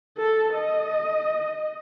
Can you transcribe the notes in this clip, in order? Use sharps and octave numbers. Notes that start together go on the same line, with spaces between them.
A4
D#5